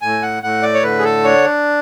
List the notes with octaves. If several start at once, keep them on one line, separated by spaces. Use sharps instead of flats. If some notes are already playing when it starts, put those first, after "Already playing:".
A2 G#5
F#5
A2 F#5
D5
C#5
D3 B4
G#4
A4
D4 C#5